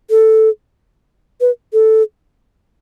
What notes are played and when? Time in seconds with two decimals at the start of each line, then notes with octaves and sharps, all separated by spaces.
0.10 A4
1.41 B4
1.73 A4